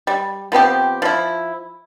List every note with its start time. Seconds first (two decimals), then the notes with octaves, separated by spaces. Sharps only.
0.07 G3
0.52 F3 B3 C4 G4
1.02 F3 E4